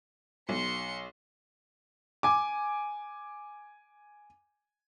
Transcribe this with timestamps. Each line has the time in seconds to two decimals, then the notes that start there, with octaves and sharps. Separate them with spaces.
0.49 B1 C6 C#7
2.23 G#5 D6